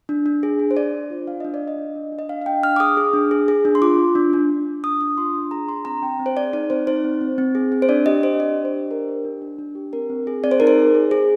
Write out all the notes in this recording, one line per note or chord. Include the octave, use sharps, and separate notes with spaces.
D4
D4
G#4
D4
C5
D4 D5
D4
F4
D4 F5
D4 D#5
D5
D4
D#5
D4
D4
D4
D#5
D4 F5
F5
D4 G5
D4 F6
D6
G#4 D#6
G#4
D4
G#4
G#4
D4
C6
F4 D6
F4
D4
D4
D4
D4
D4 D#6
D4 D#6
F4 C6
D4
G#4 A#5
D4 C6
C4 A#5
C4 G5
C4
C5
G#4 D5
D#4 D5
C4 C5
D#4 C5
C4
C4
C4
G#4
C4
C5
D4 D5
G4 D#5
D4 C5
G4 D5
D4
C5
G4
D4 A#4
G4
D4
D4
D4
G4
C4 A#4
C4
G#4
C4 D5
C5
D#4 A#4
C5
G#4
G#4
G#4